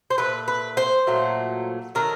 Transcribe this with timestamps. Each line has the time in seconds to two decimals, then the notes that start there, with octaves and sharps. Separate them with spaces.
0.10 C5
0.18 A#2 F#3 A3 B4
0.48 B4
0.77 C5
1.07 A#2 F#3 A3
1.95 D#3 F#3 A3 A#4